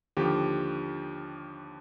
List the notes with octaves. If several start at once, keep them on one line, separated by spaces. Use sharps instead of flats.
D#2 D3 F3 G4